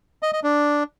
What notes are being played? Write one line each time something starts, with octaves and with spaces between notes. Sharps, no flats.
D#5
D#5
D4